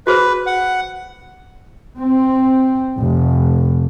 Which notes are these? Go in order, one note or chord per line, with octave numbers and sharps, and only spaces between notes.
F#4 G#4 B4 C5
F#5
C4
F1